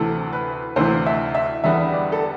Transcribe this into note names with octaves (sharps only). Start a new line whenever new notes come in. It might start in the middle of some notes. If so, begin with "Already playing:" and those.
Already playing: D2 C3 E3 A4
B4
D2 C3 E3 C5
E5
E5
E2 D3 G3 B3 E5
D5
A4